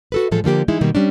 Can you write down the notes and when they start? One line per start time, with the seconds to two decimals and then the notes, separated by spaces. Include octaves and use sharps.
0.12 F#4 A4 B4
0.31 A2 E3 F3 G#3 A4
0.44 D3 F3 A#3 G4
0.68 E3 G#3 D#4 E4
0.81 B2 D#3 G3 A#3
0.95 G3 C#4 D4